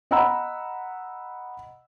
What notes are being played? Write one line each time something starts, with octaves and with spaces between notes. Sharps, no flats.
D#5 F#5 A#5 B5 E6